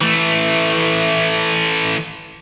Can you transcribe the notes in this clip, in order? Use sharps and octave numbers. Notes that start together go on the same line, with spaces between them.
E3 A3